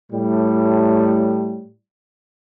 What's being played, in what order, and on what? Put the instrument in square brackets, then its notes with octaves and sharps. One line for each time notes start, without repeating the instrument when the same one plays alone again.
[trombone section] A2 G3